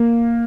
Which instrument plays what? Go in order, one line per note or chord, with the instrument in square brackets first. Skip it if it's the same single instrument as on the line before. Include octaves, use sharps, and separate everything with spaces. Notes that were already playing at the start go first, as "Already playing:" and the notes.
Already playing: [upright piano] A#3